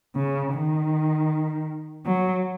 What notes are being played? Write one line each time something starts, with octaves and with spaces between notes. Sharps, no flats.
C#3
D#3
F#3